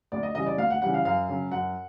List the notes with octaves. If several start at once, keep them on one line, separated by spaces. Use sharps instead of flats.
D2 D5
D#5
C#3 E3 G3 D#5
D5
D2 F5
F#5
C#3 E3 G3 F#5
F5
F#2 F5
C#3 F#3
F#2 F#5